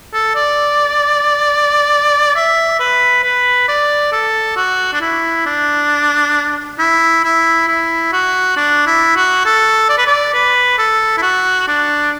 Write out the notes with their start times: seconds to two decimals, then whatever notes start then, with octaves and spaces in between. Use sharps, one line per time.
0.13 A4
0.35 D5
2.35 E5
2.80 B4
3.24 B4
3.68 D5
4.12 A4
4.56 F#4
4.93 D4
5.01 E4
5.46 D4
6.79 E4
7.24 E4
7.68 E4
8.12 F#4
8.57 D4
8.87 E4
9.16 F#4
9.45 A4
9.89 D5
9.98 B4
10.07 D5
10.34 B4
10.78 A4
11.18 E4
11.22 F#4
11.68 D4